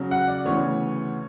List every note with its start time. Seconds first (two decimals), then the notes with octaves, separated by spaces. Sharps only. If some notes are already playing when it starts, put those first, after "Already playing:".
Already playing: C#3 F#3 C#4
0.11 F#5
0.28 D5
0.45 D2 C#3 E3 B3 C#5